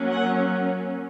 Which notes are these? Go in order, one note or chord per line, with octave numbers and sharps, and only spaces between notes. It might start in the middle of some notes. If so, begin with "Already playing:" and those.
Already playing: F#3 A#3 C#4
F#5